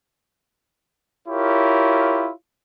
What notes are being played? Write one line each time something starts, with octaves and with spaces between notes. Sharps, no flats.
E4 F4 G4 A#4 C#5